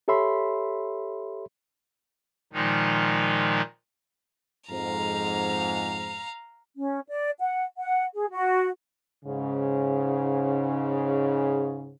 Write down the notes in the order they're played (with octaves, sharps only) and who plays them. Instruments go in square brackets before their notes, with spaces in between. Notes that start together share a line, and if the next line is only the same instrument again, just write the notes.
[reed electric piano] G4 A4 C#5 E5 B5 C6
[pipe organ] A#2 D#3 F3 G#3 D#4
[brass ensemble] F2 G#2 [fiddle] F5 A#5
[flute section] C#4
D5
F#5
F#5
G#4
F#4
[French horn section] G#2 C#3